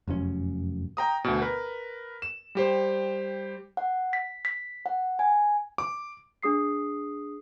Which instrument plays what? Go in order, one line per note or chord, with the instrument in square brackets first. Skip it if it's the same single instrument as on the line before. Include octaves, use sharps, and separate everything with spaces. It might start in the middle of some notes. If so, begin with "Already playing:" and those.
[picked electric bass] F1 F#2 A2 C#4
[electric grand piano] G5 A#5 D#6
D2 B2
A#4 B4
E7
G3 G4 C5
[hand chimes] F#5
B6
B6
F#5
G#5
[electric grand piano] D6
[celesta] D4 G#4 D#6 C7